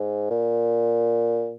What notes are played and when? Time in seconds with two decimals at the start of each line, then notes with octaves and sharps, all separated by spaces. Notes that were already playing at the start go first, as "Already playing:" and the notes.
Already playing: G#2
0.30 A#2